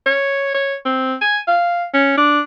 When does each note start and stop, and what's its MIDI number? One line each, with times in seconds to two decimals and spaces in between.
0.06 0.52 73
0.54 0.75 73
0.86 1.15 60
1.21 1.38 80
1.48 1.85 77
1.94 2.14 61
2.17 2.40 62